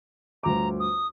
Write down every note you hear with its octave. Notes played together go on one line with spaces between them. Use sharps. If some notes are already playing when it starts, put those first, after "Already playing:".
G1 D2 A#5 D6
D#6